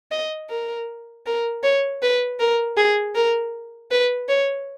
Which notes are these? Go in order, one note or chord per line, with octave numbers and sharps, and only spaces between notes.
D#5
A#4
A#4
C#5
B4
A#4
G#4
A#4
B4
C#5